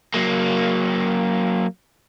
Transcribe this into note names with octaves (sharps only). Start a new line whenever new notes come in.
F#3 A#3